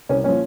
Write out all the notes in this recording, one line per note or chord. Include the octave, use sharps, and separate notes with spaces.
C2 C#4
A#2 F3 C#4